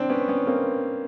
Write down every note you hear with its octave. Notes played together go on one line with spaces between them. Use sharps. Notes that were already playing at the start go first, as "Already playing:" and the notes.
Already playing: C4 D4
B3 C#4
B3 C#4
A#3 C4